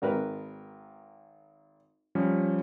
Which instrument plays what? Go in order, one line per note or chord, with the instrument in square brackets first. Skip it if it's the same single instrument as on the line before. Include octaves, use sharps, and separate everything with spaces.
[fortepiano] G#1 A#4 B4
[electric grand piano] F3 G3 C#4